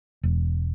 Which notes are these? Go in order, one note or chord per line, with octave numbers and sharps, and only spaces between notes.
E1